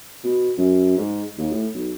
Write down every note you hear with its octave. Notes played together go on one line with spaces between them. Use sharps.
B2
F#2
G#2
D#2
A2
B1